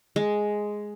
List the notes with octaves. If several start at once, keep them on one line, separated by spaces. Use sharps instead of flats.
G#3